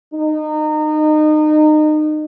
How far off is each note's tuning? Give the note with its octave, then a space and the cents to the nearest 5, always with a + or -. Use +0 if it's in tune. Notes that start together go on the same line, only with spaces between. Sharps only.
D#4 -30